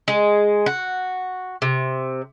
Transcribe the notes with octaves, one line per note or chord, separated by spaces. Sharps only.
G#3
F#4
C3